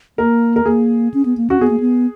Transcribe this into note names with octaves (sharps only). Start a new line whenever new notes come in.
A#3 A#4
A#4
A#3 G#4
C#4
B3
A#3
C#4 F#4
B3 G#4
A#3
B3